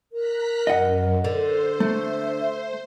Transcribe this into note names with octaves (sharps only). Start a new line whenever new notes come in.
A#4 A#5 F#6 B6
F#2 D#5 F#5
D3 C5
A3 E5